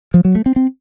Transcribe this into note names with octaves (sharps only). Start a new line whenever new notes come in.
F3
F#3
A3
C4
C4